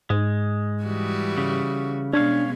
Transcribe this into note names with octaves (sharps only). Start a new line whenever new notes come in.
G#2 G#3
E3 G3 F#4
C#3
B2 G#3 B3 C#4 D4 C#5 F5